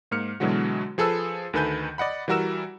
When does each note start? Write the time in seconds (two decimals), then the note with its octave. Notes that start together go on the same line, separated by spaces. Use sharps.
0.11 G#2 A#3 F6 C#7
0.40 B2 D3 E3 F#3 G#3 F#4
0.98 F3 G#4 A4 B4 E6
1.53 D2 D#3 A4 B4 G#5 G6
1.98 D5 D#5 F#5 B5
2.28 E3 G3 F#4 A#4 E6 E7